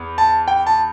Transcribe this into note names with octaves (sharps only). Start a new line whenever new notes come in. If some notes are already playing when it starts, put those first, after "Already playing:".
Already playing: E2
A5
G5
A5